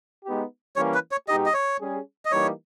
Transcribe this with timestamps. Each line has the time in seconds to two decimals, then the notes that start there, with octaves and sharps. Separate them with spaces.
0.25 G#3 B3 D#4 G4
0.76 E3 G3 A#3 C#4 C#5
0.94 B4
1.11 C#5
1.28 B2 G#3 D#4 G4 D#5
1.46 D#5
1.54 C#5
1.79 G3 C#4 G#4
2.25 D#5
2.31 E3 G3 A#3 D#4 C#5